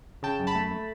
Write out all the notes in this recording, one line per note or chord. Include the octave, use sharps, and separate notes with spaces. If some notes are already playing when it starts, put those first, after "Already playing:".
C#3 G5 A5
F#2
A5 B5
A3
A3